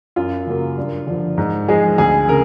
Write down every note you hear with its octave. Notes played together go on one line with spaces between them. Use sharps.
F#2 F4
C#3 F#3 A#3
G2
D3 F3
G#2
F3 G#3 G#4
D2 G#4
C#3 A#4